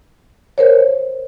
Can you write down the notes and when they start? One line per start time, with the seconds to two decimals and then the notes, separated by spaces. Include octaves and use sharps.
0.58 A#4 C5 C#5